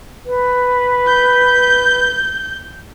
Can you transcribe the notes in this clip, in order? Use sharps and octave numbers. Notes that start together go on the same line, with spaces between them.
B4
G6